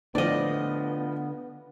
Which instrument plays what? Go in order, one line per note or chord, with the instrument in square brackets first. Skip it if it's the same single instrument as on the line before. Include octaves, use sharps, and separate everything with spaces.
[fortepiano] A2 F3 [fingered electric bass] D3 [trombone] B3 [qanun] D5 D#5